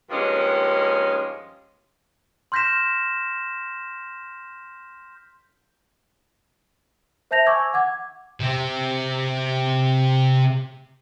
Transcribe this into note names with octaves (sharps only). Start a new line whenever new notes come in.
G2 D#3 F3 G#3 A#3 C#4
C6 F6 G6 A#6 B6 E7
C5 E5 A5 G6 A#6 F7
G#5 C#6 D6 E6 G#6
F#5 D6 G#6
C3 C4